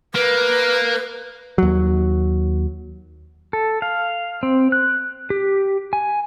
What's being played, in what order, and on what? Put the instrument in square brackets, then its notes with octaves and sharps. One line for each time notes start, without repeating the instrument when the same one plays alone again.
[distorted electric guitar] A#3 [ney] B4
[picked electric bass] D#2 F#3
[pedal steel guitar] A4
F5
C4
F#6
G4
G#5